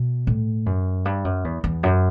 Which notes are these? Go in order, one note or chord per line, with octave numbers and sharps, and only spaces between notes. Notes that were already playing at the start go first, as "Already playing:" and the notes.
Already playing: B2
A2
F#2
G2
F#2
E2
E2
F#2